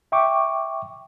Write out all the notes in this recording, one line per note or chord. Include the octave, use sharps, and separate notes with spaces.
E5 G5 C#6 D6